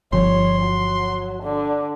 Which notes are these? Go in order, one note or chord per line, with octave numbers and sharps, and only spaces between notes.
G1 F3 C#5 C6
F#3
D3